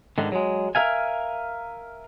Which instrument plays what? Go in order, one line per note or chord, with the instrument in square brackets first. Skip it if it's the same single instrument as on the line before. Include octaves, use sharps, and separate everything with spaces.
[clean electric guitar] G#2 D3 D#3
F#3 G#3
A#4 E5 F5 G#5